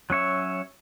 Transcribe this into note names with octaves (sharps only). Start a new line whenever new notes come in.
F#3 C#4 C#5 E5